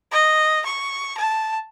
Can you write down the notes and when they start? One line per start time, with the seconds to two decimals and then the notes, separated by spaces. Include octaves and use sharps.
0.11 D#5
0.66 C#6
1.18 A5